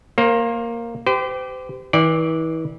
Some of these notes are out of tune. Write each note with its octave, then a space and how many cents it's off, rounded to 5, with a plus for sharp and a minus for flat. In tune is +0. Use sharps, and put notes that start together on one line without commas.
A#3 +0 C5 +35
G4 -5 C5 -40
E3 -35 D5 +0 G5 +45